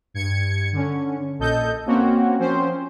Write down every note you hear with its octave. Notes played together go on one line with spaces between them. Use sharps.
G2 G#6 C#7
D3 C#4
A#1 A4 D#5 G6
A#3 C4 C#4 F#4 C#5
F3 C4 C#4 C5